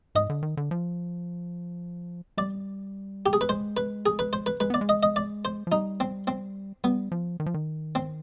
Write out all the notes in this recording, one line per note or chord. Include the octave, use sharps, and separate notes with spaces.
G#2 D#5
D3
D#3
D3
F3
G3 D5
G4
G#4
B4
G#3 C5
B4
G#4
B4
C5
B4
G#3 B4
B3 D5
G#3
D#5
D#5
D5
C5
F3
G3 D#4
C4
C4
G3 B3
F3
D#3
F3
D#3
C4